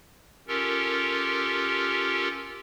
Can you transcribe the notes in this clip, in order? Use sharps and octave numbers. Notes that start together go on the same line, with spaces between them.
C#4 F4 G4 A4 A#4